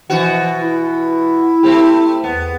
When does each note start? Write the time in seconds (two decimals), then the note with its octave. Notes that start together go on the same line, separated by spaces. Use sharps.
0.10 B2 E3 F3 F#4
0.61 E4
1.63 A3 C4 G4
2.24 E2 B3